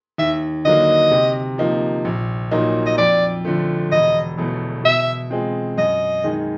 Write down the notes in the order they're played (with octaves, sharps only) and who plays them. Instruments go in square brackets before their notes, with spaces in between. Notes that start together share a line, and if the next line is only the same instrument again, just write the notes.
[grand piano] D#2 [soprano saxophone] E5
[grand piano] D3 F#3 A#3 [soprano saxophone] D#5
[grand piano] C3
F3 A#3 D#4
A#1
A#2 F#3 A#3 D#4
[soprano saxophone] D#5
[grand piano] F2 [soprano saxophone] D5
[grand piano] D3 F3 A3
[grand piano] E1 [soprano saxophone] D#5
[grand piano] E2 B2 F#3 A3
[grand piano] B2 [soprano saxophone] E5
[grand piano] G#3 C4 F4
[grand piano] F#2 [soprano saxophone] D#5
[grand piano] D#3 G#3